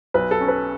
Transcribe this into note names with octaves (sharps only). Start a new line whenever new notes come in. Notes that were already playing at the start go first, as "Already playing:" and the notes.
B1 B4
A4
C#4
B4